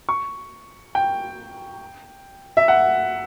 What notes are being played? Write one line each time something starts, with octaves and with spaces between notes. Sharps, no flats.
C#6
G5
E5
F#5